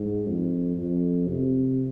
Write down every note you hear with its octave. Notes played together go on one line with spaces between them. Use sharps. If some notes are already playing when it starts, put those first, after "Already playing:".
Already playing: G#2
F2
F2
C3